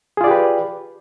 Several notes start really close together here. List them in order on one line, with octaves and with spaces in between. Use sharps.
G#4 F4 D5 G4 B4